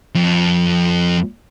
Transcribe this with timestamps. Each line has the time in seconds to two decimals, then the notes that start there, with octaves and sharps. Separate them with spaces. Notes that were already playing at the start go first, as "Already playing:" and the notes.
0.15 F2